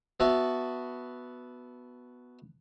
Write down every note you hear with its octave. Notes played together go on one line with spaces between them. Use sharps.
B3 F#4 E5 A5